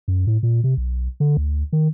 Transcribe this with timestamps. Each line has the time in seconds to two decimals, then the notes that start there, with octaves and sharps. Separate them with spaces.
0.08 F#2
0.27 A2
0.43 A#2
0.64 C3
0.77 B1
1.20 D3
1.37 D2
1.73 D#3